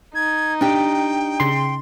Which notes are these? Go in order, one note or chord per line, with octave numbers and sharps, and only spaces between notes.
D#4 G#6
D4 G4 G5
C#3 C6